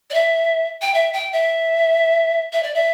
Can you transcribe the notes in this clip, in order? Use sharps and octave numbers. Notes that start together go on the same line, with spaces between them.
D5
E5
G5
E5
G5
E5
E5
D5
E5